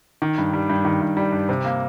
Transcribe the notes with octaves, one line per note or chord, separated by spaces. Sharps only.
D#3
G2
G3
G2
D#3
G2
G3
G2
C3
A#3